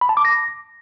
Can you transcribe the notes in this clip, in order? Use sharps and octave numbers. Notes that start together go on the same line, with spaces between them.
B5
A5
D6
A#6